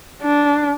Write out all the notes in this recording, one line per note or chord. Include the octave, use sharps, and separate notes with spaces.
D4